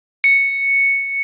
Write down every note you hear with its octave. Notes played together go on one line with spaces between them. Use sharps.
C#7